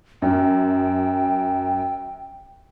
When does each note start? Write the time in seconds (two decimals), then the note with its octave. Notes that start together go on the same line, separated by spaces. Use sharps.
0.22 F#2 G5